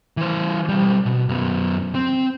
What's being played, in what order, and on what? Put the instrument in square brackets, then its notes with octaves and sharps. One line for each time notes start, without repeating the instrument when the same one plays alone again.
[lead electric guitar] E3 C5
B1 G3
B2
F#2 B3
C4